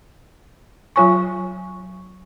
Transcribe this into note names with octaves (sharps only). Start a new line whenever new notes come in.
F#3 F4 C#5 G#5 C#6